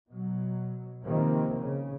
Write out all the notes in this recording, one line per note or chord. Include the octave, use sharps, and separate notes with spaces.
B2 F#3
C3 D#3 F3 A#3 C4
C#3